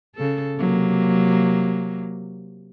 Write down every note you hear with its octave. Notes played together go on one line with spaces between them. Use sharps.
C#3 A4
C3 F#3 A#3